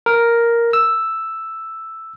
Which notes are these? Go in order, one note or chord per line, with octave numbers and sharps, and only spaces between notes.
A#4
E6